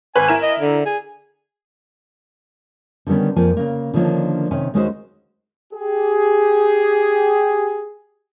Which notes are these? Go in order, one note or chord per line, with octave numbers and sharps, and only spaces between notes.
G#1 B4 G#5 F#7
E4 A#4 E7
D#5
D3
G#4
D3 D#3 G3 B3 C#4
F2 F3 A#3 G#5
C#3 A#3
D3 D#3 F3 A#3 C#4 D4
C3 D#3 C#4 G#5
D#2 G#3 C#4 D#4 F#4 C5
G4 G#4